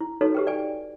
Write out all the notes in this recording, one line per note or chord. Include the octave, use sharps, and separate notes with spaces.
E4
D#4 F#4 A4 B4 C#5
G4 B4 G5
D5 G5 G#5